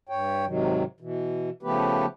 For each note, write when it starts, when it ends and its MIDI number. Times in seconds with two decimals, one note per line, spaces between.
0.09 0.45 43
0.09 0.45 73
0.09 0.45 79
0.46 0.84 44
0.46 0.84 48
0.46 0.84 51
0.46 0.84 54
1.00 1.50 47
1.00 1.50 52
1.63 2.06 49
1.63 2.06 53
1.63 2.06 57
1.63 2.06 59
1.63 2.06 67
1.63 2.06 71